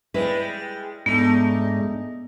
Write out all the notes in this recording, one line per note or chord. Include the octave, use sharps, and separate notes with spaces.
G3 G#3 E4 B4
G#2 G#3 A3 B3 D4 D#4